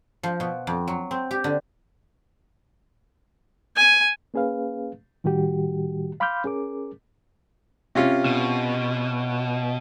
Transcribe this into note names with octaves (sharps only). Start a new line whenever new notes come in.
F3
B2
F2
F#3
C4
G4
D3
G#5
A#3 C#4 G#4 B4 F5
A2 D#3 G3 F#4 G4
F5 B5 C6 D6 F6 G6
C#4 G#4 A#4 D6
C3 C#4 F4
B2